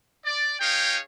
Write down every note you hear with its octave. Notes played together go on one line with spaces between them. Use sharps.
D5
D#4 G#4 C#5 F5 G5